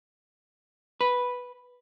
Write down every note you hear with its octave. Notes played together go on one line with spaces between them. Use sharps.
B4